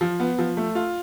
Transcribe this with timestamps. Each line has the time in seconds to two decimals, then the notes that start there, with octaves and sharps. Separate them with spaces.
0.01 F3
0.20 B3
0.38 F3
0.57 A3
0.75 F4